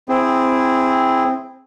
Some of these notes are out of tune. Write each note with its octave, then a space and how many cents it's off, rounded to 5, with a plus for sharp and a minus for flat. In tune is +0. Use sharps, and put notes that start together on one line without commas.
C4 +0 E4 +0 G#4 -15